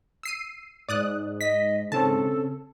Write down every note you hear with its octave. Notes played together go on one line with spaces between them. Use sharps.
E6 C7 D#7
G#2 D5 D#6 F#6
D#5 B6
C#3 C4 C#4 A4 A5